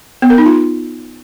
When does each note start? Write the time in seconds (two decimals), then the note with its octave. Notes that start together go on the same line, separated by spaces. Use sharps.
0.22 B3
0.30 A#4
0.38 D#4
0.46 F4